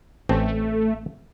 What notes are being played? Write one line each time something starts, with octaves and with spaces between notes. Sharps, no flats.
A1 A3 C4